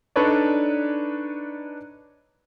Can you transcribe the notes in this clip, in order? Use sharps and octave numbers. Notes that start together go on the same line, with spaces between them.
D4 D#4 A4 B4 C#5 D5